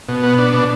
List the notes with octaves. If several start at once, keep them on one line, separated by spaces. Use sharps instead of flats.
B2
B3
D4
B2